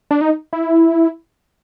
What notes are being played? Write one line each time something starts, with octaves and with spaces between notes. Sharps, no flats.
D4
D#4
E4